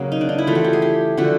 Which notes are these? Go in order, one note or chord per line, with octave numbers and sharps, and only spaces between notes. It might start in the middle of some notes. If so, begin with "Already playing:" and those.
Already playing: C#3 F#3 A#3
D#4
D4
D#4
E4
E3 A3 F4
F#4
G4
G#4
G4
D3 F3 A3 F#4